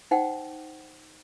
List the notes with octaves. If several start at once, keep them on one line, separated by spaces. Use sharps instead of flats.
D#4 C5 F#5 G5